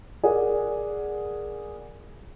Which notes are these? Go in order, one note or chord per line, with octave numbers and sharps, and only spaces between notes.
G#4 A#4 D5 F#5